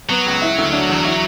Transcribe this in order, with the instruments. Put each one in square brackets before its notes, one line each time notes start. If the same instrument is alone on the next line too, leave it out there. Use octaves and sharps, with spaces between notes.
[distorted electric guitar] F#3 [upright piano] B3
[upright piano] C#2
E4
D2
D4
E2
E4